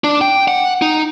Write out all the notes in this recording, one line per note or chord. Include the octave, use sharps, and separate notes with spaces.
D4
G5
F#5
D#4